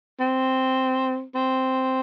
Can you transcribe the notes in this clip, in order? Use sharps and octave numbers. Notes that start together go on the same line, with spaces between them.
C4
C4